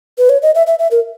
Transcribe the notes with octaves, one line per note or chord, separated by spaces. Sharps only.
B4
C#5
D#5
E5
E5
E5
A#4